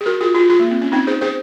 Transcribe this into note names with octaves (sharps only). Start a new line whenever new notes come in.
G#4
F#4 A#4
F4 G#4
F4 G#4
F4 G#4
A#3
C4
C#4
C4 D#4
G#4 C5
G#4 C5